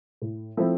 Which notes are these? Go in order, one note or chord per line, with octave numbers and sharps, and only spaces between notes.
A2
F3 A3 C4 E4